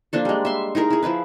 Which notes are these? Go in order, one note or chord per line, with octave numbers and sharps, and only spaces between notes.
F3 A#3 D4 A4
G3 G#3
E5 C6
D#4 E4 G#4 A#4
E4 G#4
F3 E4 G#4 B4